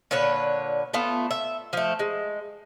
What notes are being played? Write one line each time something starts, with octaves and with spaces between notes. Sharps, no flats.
A#2 D3 B4 C#5
A3 B3 F4
E5
F3 A3
G#3